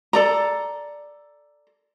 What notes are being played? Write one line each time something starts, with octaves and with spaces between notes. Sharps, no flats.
A4 D5 A#5